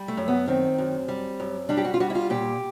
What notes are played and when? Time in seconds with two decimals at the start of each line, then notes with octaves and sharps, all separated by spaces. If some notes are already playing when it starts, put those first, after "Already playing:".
Already playing: G3
0.08 A3
0.17 F#2
0.28 B3
0.48 D#3 C4
0.78 F#2
1.08 G3
1.40 F#2
1.69 G3 D4
1.77 G4
1.85 F#4
1.94 F4
2.00 G3 F#4
2.10 E4
2.15 F4
2.30 A#2 G4